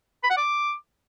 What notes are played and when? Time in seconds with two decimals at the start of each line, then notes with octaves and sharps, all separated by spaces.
0.24 B5
0.30 F#5
0.37 D6